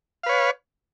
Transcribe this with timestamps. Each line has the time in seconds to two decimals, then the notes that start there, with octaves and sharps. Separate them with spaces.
0.23 F5
0.26 B4
0.29 C#5